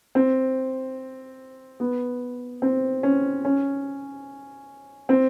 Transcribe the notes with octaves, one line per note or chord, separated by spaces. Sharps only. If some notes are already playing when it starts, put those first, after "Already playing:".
C4
B3
C4
C#4
C#4
C4